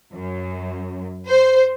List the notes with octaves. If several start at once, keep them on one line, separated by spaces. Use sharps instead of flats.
F#2
C5